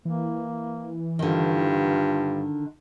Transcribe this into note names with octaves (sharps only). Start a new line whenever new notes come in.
E3 A#3
G2 D3 D#3 F4